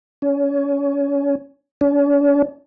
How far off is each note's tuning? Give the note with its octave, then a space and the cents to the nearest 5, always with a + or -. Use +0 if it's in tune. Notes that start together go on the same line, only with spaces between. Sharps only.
C#4 +25
C#4 +45